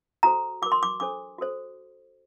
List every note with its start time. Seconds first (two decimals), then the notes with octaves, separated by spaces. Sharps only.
0.23 F#4 A4 C5 A#5
0.62 F#4 A#4 D6
0.72 C6
0.83 D6
1.00 D4 A4 C5 D6
1.38 F#4 A4 C5